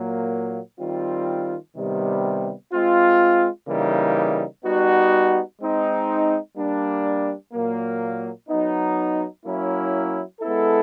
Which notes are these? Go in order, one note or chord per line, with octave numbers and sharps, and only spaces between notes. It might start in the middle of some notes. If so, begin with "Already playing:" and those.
Already playing: A#2 F#3 A#3
D#3 G3 C4 F4
C3 D#3 G3 B3
G#3 C4 F4
C#3 E3 G3 A#3 D#4
G3 B3 D#4 F#4
G#3 C4 D#4
G3 A#3 D4
A#2 F#3 A#3
F#3 B3 D#4
F#3 A#3 C#4 E4
G#3 B3 E4 A4